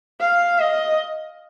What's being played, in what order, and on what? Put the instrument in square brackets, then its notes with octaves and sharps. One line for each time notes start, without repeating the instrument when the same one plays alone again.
[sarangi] F5
D#5